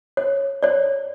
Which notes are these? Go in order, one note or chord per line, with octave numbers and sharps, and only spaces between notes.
C#5
C#5 D5